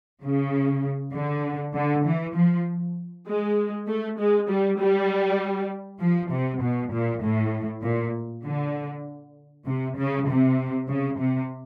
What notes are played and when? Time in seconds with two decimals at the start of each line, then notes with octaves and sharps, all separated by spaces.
0.22 C#3
1.14 D3
1.75 D3
2.05 E3
2.35 F3
3.27 G#3
3.87 A3
4.18 G#3
4.49 G3
4.79 G3
6.01 F3
6.31 C3
6.62 B2
6.92 A#2
7.23 A2
7.83 A#2
8.44 D3
9.66 C3
9.97 C#3
10.26 C3
10.88 C#3
11.18 C3